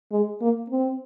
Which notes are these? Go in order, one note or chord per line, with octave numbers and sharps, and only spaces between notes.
G#3
A#3
C4